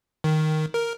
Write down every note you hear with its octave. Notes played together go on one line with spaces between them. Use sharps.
D#3
A#4